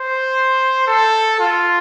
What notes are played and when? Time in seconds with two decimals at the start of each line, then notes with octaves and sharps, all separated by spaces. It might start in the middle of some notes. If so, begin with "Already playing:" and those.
Already playing: C5
0.87 A4
1.40 F4